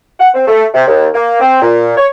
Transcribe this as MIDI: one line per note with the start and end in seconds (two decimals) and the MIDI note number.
0.20 0.29 78
0.34 0.45 60
0.47 0.65 57
0.74 0.84 48
0.88 1.07 39
1.14 1.38 58
1.40 1.59 60
1.62 1.95 46
1.97 2.06 73